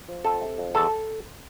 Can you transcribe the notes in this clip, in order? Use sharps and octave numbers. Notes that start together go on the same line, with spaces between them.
F3
F2 A4
C3
F2
E2 A4